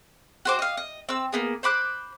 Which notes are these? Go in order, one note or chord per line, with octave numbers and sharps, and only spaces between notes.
F#4 C5 D6
D#5 F5
D#5
C4 E6
A#3 B3 G#4
C5 B5 D6 F#6